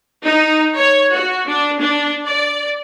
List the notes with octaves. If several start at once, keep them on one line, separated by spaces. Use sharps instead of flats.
D#4
C#5
F#4
D4
D4
D5